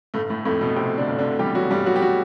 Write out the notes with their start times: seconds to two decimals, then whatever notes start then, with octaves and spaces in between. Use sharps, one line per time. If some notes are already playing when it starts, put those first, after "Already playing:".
0.14 G1 A2 A3
0.30 A2 A3
0.45 F2 A2 A3
0.61 B2 B3
0.76 F2 C3 C4
0.97 D3 D4
1.08 G1
1.18 D3 D4
1.39 E3 G3 G4
1.55 F#3 F#4
1.70 G1 G3 G4
1.86 F#3 F#4
1.96 G4
2.02 F#3 F#4